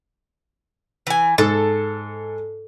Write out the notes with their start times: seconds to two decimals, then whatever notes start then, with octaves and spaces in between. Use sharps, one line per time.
1.07 E3 G#5
1.38 G#2 A4